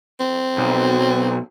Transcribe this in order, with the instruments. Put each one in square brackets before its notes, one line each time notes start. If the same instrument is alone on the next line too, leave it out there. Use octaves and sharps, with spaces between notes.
[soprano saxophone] C4
[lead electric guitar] B1